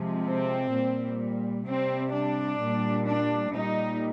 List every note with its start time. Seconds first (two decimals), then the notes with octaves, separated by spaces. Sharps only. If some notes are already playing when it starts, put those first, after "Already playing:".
Already playing: C3 F3 G#3
0.26 C4
0.73 A#2 G3
1.67 C3 G3 C4
2.13 D4
2.60 A#2 G3
3.07 D4
3.54 A#2 G3 D#4